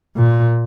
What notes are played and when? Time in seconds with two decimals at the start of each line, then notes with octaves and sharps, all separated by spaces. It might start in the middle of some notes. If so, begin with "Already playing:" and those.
0.17 A#2